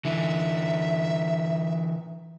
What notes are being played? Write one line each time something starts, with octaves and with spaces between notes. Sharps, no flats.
D3 E3 E5